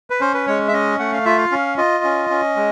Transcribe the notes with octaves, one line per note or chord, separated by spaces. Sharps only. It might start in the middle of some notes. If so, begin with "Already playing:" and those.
B4
C#4 C5
B4
G#3 C#5
E5
C#4 D#5
A3 F#5
F5
F4 E5
F5
C#4
F4 D#5
C#4
C#4
G#3